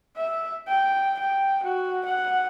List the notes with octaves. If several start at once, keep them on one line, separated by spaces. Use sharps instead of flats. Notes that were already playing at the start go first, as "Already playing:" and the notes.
E5
G5
G5
F#4
F#5